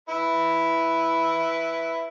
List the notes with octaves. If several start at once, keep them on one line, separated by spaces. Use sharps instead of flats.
E4 B4